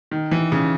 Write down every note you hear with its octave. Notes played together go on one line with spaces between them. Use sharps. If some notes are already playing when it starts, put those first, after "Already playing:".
D#3
E3
C#3